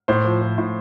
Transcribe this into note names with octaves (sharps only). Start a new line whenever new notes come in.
A2 C5
F3
F3
A2